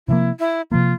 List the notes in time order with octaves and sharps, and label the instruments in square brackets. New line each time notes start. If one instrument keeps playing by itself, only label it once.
[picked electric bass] C3 F3 A#3 [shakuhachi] E4
[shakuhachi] E4
[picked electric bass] C3 F3 A#3 [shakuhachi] F4